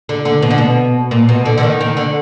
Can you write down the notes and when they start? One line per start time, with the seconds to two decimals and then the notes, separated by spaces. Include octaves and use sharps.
0.09 D3
0.25 D3
0.42 B2
0.51 D3
0.58 B2
1.11 A#2
1.29 B2
1.45 D3
1.58 D3
1.63 D#3
1.81 D#3
1.97 D3